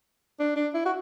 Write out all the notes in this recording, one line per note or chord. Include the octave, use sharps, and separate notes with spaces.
D4
D4
E4
F#4